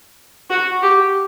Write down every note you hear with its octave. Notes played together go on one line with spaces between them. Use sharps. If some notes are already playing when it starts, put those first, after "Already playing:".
F#4
G4